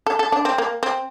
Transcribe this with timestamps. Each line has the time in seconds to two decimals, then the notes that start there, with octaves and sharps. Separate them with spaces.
0.06 A4
0.19 A4
0.32 D4
0.45 C4
0.58 A#3
0.83 C4